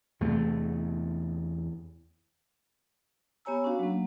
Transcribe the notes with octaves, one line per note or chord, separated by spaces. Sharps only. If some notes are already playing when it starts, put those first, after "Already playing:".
E2 C3 A3
B3 G4 C#5 G#5 A#5 E6
C#4 D4 F#4 F5
F#3 A#3